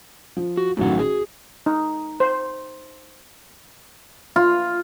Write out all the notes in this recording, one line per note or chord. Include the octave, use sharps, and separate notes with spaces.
F3
F#4
A1 A2 D#3 F#3 F#4 F#5
F#4 G#4
D#4
C5
F4